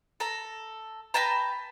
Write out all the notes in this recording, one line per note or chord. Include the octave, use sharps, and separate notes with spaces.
A4 A#5
B4 G5 A5 A#5